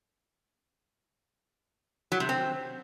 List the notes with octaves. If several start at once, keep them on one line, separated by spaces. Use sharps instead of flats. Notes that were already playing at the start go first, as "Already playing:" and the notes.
F#3
C3
C4